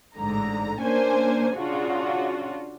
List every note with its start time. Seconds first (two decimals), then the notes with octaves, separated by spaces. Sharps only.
0.17 A1 G#2 D3 A#5
0.81 A#3 C#4 D4 C5 G#5
1.56 C#3 D4 F4 F#4